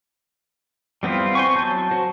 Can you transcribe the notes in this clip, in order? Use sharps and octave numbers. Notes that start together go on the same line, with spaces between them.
G3 B3 C4 E4 F4
C5 G#5 C#6
F#3 A5 G6
F#4 C5